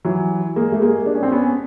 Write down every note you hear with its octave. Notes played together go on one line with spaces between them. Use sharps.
E3 F#3
G#3 A#3
A3
G#3 A#3
D4
C#4
C4 D4
B3 C#4